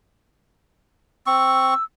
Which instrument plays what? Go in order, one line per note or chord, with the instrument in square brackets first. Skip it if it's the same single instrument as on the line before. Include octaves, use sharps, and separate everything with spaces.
[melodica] C4 C#6 [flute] E6